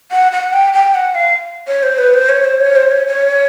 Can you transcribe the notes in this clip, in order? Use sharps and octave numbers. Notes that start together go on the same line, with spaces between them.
F#5
F#5
G5
G5
F#5
F5
C#5
C5
B4
C5
C#5
C5
C#5
C5
C#5
C#5